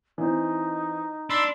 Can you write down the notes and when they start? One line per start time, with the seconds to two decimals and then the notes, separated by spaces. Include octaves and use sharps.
0.18 E3 C4 D#4
1.30 D4 B5 C6 E6